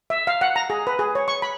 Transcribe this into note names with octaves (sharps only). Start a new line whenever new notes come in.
E5
F5
F#5
A#5
G#4
B4
G#4
C#5
C#6
B5